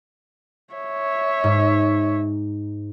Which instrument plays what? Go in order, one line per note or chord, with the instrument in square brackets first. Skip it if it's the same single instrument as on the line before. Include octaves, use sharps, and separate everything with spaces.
[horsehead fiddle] C#5 E5
[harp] G#2